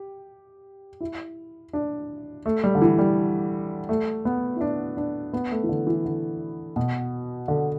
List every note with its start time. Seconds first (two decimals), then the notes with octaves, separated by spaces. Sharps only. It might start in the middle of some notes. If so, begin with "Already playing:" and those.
Already playing: G4
1.01 E4
1.73 D4
2.46 A3
2.64 G3
2.75 D3
2.82 E3
2.99 G3
3.89 A3
4.25 B3
4.56 E4
4.61 D4
4.97 D4
5.33 B3
5.51 A3
5.64 E3
5.69 D3
5.87 E3
6.05 D3
6.76 B2
7.48 D3